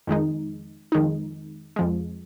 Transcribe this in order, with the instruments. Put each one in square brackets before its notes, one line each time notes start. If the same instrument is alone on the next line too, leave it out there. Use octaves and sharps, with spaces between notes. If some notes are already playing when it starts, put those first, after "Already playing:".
[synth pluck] F2 D#3 G#3 D#4
F2 D#3 G#3 D#4
F2 F3 G#3